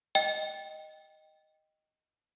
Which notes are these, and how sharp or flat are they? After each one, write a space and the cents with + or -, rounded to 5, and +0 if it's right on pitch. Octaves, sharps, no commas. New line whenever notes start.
D#5 +0 G5 +0